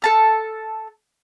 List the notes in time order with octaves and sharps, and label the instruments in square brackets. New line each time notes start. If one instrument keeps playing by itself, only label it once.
[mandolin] A4 A5 F6